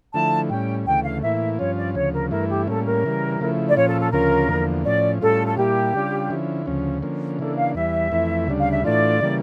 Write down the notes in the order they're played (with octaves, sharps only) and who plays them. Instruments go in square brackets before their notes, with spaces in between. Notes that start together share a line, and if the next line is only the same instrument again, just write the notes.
[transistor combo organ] D3 F3 A3 E4 [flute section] A5
[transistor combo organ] A2 G3 C#4 [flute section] G5
[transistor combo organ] D2 C#3 E3 A3 [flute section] G5
[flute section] F5
[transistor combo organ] A2 E3 A#3 E4 [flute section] E5
[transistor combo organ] G2 F3 C#4 F4 [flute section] C#5
[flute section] D5
[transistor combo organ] D2 C#3 F3 [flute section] C#5
[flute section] A#4
[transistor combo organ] G2 E3 A3 E4 [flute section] A#4
[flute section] G4
[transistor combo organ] A2 G3 A#3 C#4 [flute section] A4
[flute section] A#4
[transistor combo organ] C#3 E3 G3
C#3 F3 A3 E4
[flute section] D5
[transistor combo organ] A#2 F3 C#4 F4 [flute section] C#5
[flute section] A4
A4
[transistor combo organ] D2 C#3 F3 C#4 F4 [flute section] A#4
[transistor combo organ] E2 D3 F3 A#3
[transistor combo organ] A2 F3 C#4 [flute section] D5
[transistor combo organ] A2 G3 C#4 F4 [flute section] A4
[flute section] A4
[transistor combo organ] A#2 G3 A#3 E4 [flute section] G4
[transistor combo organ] C#3 G3 D4 F4
D3 F3 C#4 E4
D2 C#3 F3 C#4
D3 F3 A#3 C#4
[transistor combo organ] C#3 E3 A#3 D4 [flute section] A4
[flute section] F5
[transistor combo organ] E2 E3 G3 [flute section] E5
[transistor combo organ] F2 E3 A3 E4
D2 C#3 G3 D4
[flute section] F5
E5
[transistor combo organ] A2 E3 A3 D4 F4 [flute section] D5
[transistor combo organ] C#3 E3 G3 A#3